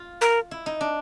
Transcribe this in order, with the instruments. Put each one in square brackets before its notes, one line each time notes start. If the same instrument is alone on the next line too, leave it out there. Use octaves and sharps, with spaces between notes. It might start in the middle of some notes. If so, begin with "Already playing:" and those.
Already playing: [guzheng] F4
[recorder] A#4
[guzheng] E4
D#4
D4